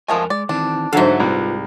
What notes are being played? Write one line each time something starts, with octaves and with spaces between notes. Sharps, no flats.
F2 F3 G#3 A3 A#4 G#5
G#3 D5
D#3 E3 C4 D4
G#2 D3 F#3 A4 E5 F5
C2 F4 B4